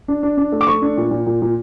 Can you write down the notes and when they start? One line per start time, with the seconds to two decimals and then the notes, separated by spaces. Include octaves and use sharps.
0.08 D4
0.23 D4
0.38 D4
0.52 A3
0.61 D6
0.67 A3 C#6
0.82 D4
0.97 A#2
1.11 A#2
1.26 A#2
1.42 A#2